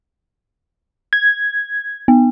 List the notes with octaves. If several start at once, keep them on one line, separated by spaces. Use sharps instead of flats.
G#6
B3